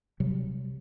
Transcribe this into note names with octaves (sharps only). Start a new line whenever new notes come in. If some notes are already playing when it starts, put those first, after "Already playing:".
C3 F#3 G3